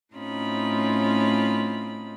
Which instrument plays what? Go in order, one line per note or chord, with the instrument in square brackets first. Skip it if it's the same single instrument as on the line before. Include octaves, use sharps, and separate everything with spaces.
[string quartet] A2 C4 C#4 D#4 F4 B5